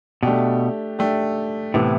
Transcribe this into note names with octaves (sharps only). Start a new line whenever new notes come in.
B2 A3 D4 G4
A3 D4 G4
A2 C3 E3 B3 E4